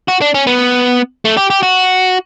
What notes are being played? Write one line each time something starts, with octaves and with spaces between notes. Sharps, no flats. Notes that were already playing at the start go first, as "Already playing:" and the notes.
F#4
D4
C#4
B3
A3
G4
G4
F#4